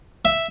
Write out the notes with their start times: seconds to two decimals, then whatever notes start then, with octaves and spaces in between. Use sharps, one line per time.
0.25 E5